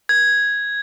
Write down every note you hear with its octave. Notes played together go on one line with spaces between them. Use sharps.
G#6